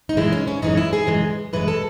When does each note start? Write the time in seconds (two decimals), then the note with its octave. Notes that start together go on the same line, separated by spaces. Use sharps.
0.09 D#4
0.17 F#2 E3 G#3 E4
0.32 C#4
0.47 C#4
0.62 F#2 E3 G#3 D#4
0.77 E4
0.93 G#4
1.07 F#2 E3 G#3
1.53 F#2 E3 G#3 B4
1.68 A4